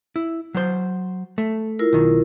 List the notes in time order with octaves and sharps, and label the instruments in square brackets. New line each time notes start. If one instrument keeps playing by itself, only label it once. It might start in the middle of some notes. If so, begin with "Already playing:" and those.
[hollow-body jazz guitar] E4
F#3 C5
A3
[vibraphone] E4 F4 A#4
[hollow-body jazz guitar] B1 D#3